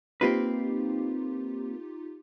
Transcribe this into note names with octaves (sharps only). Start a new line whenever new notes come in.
A#3 C4 D#4 F4 G4 B4